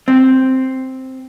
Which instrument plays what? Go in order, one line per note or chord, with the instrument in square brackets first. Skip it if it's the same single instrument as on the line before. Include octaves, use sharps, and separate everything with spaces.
[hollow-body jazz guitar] C4